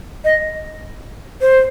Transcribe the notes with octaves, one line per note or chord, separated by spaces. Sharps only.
D#5
C5